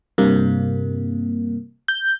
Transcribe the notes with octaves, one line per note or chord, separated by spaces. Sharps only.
G2 C3 A#3
G6